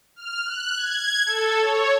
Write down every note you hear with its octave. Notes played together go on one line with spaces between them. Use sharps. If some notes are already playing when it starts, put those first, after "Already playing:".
F6
F#6
G#6
A4
C#5